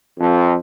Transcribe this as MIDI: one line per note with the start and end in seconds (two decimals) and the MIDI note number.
0.20 0.55 41